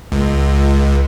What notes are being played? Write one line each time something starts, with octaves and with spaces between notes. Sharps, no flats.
C#2